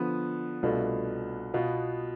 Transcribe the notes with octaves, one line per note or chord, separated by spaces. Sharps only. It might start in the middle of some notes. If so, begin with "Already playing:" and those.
Already playing: D3 F3 B3
C2 B2 A3 D4 F4
B2 B3 F4